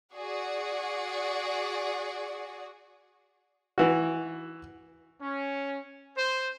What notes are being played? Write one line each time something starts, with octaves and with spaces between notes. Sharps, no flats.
F#4 G#4 D5 F#5
E3 F#4
C#4
C5